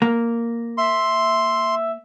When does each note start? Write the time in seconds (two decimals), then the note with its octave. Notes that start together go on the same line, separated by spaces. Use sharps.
0.02 A#3 A#4
0.78 E5 C6